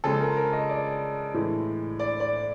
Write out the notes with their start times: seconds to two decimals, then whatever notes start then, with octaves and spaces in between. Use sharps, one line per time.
0.04 C#3 F3 G#3 A4
0.20 A#4
0.36 A#4
0.53 D#5
0.69 D5
1.34 A2 E3 G#3
1.99 D5
2.20 D5